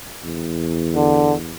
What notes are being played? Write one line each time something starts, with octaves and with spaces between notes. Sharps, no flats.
E2
D3